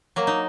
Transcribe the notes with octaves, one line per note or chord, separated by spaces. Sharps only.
F#3 A#3
D#4